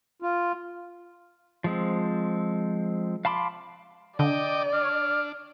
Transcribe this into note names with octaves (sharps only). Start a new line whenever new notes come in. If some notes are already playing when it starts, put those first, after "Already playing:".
F4
F3 G#3 C4
F5 A5 B5 C6 D6
D3 D5 D#5 G5 D6
D4 F6